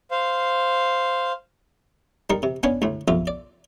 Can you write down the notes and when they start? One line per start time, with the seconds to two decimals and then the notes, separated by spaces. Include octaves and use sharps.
0.11 C5 F5
2.30 G3 D#4 A#4 C#6
2.43 C3
2.63 B3 C#4 D4 F5 G#5
2.82 D2 A2
3.08 B1 F2 F4 E5
3.27 D5